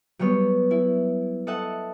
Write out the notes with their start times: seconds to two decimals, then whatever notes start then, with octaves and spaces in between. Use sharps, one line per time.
0.19 F#3 G3 B3 C#5
0.71 E4
1.47 A4 D#5 E5 F#5 A5